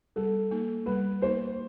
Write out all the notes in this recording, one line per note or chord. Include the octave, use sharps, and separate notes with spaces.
G3 A4
A#3 D#4
G3 B4
A#3 D#4 C5